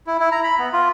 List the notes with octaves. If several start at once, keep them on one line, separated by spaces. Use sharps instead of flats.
E4
E4
A#5
B5
B3
F4